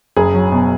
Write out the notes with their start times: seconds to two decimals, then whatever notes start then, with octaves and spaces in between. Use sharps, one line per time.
0.16 F#1 G#4
0.34 F#3
0.52 B2